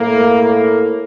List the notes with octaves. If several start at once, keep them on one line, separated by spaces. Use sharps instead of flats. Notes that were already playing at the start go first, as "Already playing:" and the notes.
Already playing: A2 A3 A#3
A#3